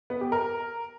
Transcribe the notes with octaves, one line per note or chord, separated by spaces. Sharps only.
B3
G4
A#4